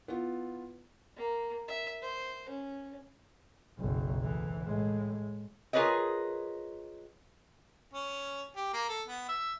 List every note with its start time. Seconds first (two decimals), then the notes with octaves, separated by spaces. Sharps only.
0.08 B3 E4 F4
1.17 A#3
1.68 E5
2.02 C5
2.49 C#4
3.77 F#1 B1
4.23 D2 E3
4.64 A2 G#3
5.73 F4 G#4 A#4 B4 C#5 D#5
7.93 C#4
8.56 G4
8.74 A#3
8.89 A4
9.08 B3
9.29 E5